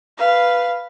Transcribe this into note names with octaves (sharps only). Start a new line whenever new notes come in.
B4 F5